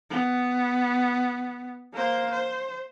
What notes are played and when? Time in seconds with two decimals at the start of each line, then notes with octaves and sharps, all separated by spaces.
0.10 B3
1.94 A#3 C5
2.32 C5